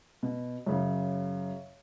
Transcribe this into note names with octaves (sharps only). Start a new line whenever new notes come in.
B2
F#2 C#3 F#3